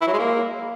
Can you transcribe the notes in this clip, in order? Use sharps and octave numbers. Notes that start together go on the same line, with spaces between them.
E4
F#3
G#3
A#3